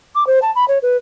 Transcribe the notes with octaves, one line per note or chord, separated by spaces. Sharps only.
D6
C5
A5
B5
C#5
B4